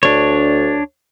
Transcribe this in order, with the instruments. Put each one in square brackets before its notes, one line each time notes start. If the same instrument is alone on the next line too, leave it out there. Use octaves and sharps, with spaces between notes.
[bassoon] D2 [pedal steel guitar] D4 C#5